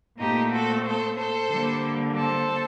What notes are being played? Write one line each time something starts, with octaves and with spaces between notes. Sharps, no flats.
A#2 A3 C4 D#4 G4
F#4 A4
A4 C5
A4 C5
D3 G3 A#3
A4 C5